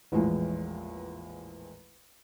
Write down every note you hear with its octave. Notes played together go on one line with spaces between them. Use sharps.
A1 E2 A#2 E3 F3 G#3